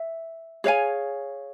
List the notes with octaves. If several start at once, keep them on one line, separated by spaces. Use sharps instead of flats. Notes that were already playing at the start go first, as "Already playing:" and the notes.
Already playing: E5
G#4 C#5 F5 G#5